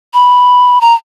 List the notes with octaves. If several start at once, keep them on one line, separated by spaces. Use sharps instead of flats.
B5
A#5